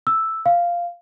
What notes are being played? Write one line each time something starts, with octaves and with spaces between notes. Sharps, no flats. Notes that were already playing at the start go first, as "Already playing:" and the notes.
E6
F5